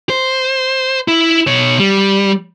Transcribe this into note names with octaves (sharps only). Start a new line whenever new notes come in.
C5
E4
B2 C#5
G3